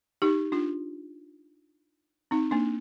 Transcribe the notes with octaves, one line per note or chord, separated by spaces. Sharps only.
D#4 G4
D4 F4
C4 D#4
A#3 D4